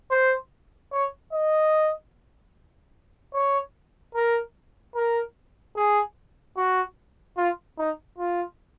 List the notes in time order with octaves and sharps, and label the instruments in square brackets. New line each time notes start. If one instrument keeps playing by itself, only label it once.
[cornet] C5
C#5
D#5
C#5
A#4
A#4
G#4
F#4
F4
D#4
F4